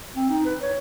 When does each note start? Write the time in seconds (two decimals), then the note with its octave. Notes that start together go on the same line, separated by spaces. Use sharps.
0.15 C4
0.30 D#4
0.45 B4
0.62 C#5